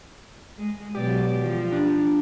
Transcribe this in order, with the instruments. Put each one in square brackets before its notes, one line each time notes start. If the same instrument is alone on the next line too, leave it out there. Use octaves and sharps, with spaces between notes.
[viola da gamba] G#3
[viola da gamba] B2 F#3 D5 [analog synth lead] G4
[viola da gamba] F3
[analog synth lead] D4